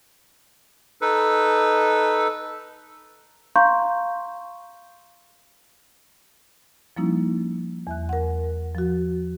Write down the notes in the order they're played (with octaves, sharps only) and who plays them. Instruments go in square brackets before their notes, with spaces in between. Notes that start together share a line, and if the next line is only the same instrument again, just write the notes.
[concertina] D#4 A4 B4
[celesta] F5 A#5 C6 C#6 G6
[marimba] F3 G3 A#3 C#4 D#4 E4
E2 E5 F#6
A#4 F#5
F3 F#4